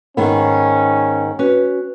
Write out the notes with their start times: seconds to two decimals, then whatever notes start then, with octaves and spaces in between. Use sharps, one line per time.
0.17 G#2 D#3 B3 C#4
1.39 C#4 F#4 B4